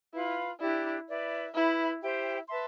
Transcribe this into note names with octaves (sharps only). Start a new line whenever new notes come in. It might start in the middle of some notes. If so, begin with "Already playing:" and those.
E4 F4 B4 F5 B5
D4 E4 G4 D5
E4 B4 D5
E4 B4 E5 B5
E4 G4 C5 G5
B4 E5 A5 C6